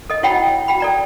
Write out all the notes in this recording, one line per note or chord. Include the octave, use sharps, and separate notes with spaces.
A4 D#5
E4 F#4 C#5 F#5 G5 B5
F#4 G5 B5
A4 D5 A#5